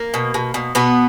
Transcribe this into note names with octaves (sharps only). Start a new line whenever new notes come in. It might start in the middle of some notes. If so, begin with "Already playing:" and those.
Already playing: A#3
B2
B2
B2
B2 B3